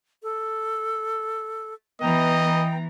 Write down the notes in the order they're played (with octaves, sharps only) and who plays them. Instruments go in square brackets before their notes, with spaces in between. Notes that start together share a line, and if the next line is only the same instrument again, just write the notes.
[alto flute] A4
[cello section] E3 [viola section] B3 A#5 [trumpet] D#5 [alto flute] G5